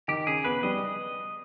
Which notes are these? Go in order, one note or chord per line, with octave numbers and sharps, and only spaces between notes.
D#3 G4
C#3 G#4
B3 B4
G3 D#5